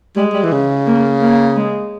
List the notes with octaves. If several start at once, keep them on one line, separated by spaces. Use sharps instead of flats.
G3 G#3
G3
E3
C#3
A#3
A#3
G#3